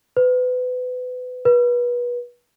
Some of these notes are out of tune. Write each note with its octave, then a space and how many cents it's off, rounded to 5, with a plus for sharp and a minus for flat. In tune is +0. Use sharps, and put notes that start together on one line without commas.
B4 +30
B4 -30